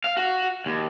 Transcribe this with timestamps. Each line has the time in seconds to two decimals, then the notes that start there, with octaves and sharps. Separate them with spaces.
0.04 F5
0.17 F#4
0.66 D#2